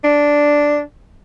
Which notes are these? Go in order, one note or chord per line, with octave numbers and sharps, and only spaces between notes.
D4